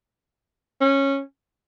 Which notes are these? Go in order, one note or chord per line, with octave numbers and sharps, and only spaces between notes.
C#4